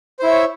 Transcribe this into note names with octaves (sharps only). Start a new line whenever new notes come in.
E4 C5 C#5 E5